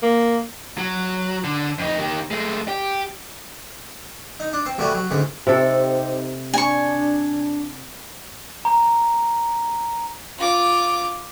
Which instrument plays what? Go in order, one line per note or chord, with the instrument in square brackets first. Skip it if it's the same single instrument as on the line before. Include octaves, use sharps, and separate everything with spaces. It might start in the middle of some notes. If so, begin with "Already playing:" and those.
[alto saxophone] A#3
[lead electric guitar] F#3
D3
F2 D#4
D#3 G4
G#3 A3
G4
[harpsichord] D#4
D4
C4 C6
C2 A2 C3 G3 F#4 G#5
F#3
D2 G#2 C#4
[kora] C3 A4 [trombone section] C4 D#4 G4
[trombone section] D4 [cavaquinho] G#5 C#6
[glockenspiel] A#5
[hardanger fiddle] F4 D6